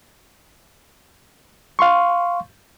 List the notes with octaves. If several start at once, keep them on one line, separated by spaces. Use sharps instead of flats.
F5 C6 C#6